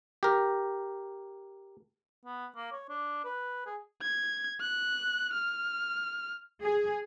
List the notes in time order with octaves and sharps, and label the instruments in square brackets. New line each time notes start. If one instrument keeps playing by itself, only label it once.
[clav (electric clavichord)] G4 A#4
[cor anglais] B3
A#3
C#5
D4
B4
G#4
[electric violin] G#6
F#6
F6
[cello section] G#4